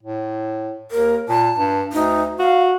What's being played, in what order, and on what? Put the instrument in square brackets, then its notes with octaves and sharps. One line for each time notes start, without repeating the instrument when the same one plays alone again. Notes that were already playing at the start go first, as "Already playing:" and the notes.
[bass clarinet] A2
[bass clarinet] D#2 [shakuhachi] A#4
[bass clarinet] A#2 [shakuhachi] A5
[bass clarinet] G2
[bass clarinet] D2 [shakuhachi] D#4
[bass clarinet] F#4 [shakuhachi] F5